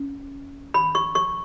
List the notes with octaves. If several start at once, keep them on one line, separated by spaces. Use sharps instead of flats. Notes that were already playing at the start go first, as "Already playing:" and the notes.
Already playing: C#4
B5
C#6
C#6